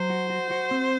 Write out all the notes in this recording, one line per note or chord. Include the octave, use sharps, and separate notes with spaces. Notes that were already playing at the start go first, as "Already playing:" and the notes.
Already playing: F#3 C5
F#4
F#4
F#4
C4